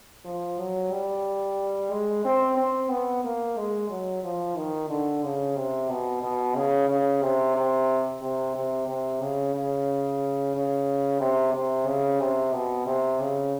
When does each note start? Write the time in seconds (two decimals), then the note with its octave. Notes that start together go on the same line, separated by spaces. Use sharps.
0.25 F3
0.59 F#3
0.91 G3
1.91 G#3
2.25 C4
2.57 C4
2.90 B3
3.24 A#3
3.57 G#3
3.90 F#3
4.23 F3
4.57 D#3
4.89 D3
5.23 C#3
5.57 C3
5.89 B2
6.23 B2
6.55 C#3
6.88 C#3
7.22 C3
7.56 C3
8.22 C3
8.56 C3
8.88 C3
9.21 C#3
9.55 C#3
10.55 C#3
11.20 C3
11.54 C3
11.87 C#3
12.20 C3
12.53 B2
12.86 C3
13.20 C#3